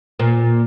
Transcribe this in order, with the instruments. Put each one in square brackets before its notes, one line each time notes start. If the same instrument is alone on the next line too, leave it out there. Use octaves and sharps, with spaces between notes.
[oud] A#2